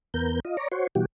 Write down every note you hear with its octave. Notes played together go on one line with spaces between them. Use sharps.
E2 B3 A#4 G6
F4 D#5
C#5 D5 A#5
F#4 C5 C#5
B2 E3 G3 F#4 G4